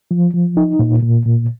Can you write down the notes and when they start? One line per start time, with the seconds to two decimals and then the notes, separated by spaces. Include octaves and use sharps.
0.11 F3
0.34 F3
0.57 D#4
0.79 A#2
1.03 A#2
1.26 A#2